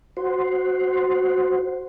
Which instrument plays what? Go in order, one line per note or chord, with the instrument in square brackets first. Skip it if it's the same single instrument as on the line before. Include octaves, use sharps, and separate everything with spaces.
[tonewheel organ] F#4 C5